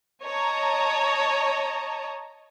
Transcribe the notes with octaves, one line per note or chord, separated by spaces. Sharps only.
C#5 D#5 A5 A#5